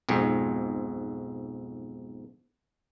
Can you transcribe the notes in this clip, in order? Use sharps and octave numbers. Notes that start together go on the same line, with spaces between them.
B1 F2 G#2